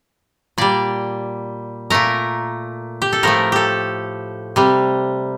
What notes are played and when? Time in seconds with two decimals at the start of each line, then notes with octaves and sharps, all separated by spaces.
0.58 A#2 G3 D5
1.90 A#2 A3 A#4
3.02 G4
3.13 A4
3.23 A2 F3 A3 A#4
3.52 G4 A4
4.56 C3 G3